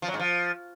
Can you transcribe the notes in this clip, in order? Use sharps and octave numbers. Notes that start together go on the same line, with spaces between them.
F3
F#3
G#2
F3